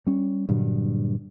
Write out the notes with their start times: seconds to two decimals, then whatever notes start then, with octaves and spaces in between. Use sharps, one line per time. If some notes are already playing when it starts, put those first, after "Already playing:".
0.07 G3 C#4
0.49 G2 A#2 D3 F#3